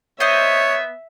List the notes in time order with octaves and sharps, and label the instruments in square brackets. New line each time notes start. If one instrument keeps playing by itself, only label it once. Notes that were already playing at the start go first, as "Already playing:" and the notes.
[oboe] B3 [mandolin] C5 D#5 [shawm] C#5 [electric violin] E5